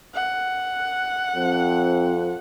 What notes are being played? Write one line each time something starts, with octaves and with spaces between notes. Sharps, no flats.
F#5
F2 C4